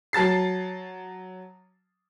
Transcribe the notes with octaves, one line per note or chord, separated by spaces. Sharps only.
F#3 A5 A6 C7